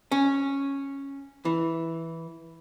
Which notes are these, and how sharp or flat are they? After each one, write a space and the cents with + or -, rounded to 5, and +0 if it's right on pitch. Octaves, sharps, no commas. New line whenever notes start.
C#4 -5
E3 -5